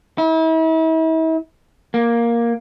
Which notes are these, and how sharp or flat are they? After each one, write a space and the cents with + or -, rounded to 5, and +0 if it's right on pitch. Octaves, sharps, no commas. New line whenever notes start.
E4 -40
A#3 +5